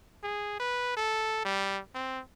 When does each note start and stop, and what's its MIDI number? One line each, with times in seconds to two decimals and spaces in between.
0.23 0.59 68
0.60 0.94 71
0.97 1.42 69
1.45 1.80 55
1.94 2.21 60